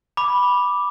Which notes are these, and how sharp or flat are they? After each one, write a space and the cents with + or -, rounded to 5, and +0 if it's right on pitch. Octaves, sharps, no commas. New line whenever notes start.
B5 -5 D6 +0